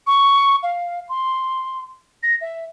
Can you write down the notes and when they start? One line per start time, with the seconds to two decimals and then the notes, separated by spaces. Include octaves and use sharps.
0.07 C#6
0.63 F5
1.09 C6
2.23 A#6
2.41 E5